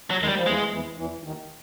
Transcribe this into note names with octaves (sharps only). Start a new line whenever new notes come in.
F#3
D#2 D#3
G#3
G3
F3
E2 E3 G#3
E2 E3
E2 E3
D#2 D#3